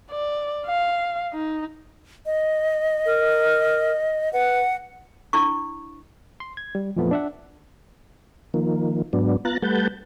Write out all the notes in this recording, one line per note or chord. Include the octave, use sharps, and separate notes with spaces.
D5
F5
D#4
D#5
A#4
B4 F#5
D4 E4 C#6
C6
G#6
G3
F2 A#2 E3 F3 A3 B3
D4 E5 F#5
D#3 F3 A#3
G#2 F#3 B3 D4
B3 F4 A#5 F#6 A6
G3 A3 B4 F#5 A5 G6